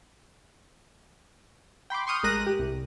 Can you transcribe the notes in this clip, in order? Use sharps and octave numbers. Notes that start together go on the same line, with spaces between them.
G5 B5 C6 D6
C6 C#6 D#6 F6 G6
A1 G#3 A#4 F#6 A#6 D#7
G4
C2